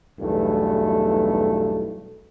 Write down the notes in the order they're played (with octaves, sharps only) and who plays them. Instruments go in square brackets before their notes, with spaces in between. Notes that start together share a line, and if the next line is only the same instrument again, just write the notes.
[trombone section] B1 E2 G2 A3